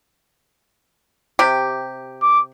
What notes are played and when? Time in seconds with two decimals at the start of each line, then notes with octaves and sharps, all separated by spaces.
1.39 C3 G4
2.22 D6